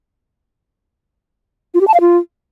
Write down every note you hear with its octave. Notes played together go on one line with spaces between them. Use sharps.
F4
G4
A5
F5
F4